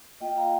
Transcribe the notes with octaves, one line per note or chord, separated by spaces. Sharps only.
A#3 F4 D#5 G5
F5 A#5